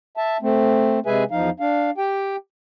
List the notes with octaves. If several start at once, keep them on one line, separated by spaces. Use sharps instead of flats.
E5 A5
A3 C4
C3 G#3 G#4 B4 E5 G#5
E2 F3 D#4 F5
D4 F5
G4 G5